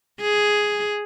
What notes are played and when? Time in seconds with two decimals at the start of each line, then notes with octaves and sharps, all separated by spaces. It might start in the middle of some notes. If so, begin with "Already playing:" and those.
0.21 G#4